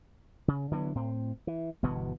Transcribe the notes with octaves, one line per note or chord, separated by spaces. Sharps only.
C#3
D3 E3 F#3 B3
A2 C4
E3
G1 B2 E3 B3